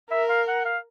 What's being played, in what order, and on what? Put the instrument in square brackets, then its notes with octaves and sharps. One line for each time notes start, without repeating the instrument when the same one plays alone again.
[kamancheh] A#4 [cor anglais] E5
[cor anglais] F5
F#5
F5